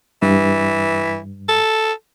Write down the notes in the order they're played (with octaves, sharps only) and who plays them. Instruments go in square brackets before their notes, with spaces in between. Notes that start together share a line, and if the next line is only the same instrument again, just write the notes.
[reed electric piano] G2 [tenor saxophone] E3
[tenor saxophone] A4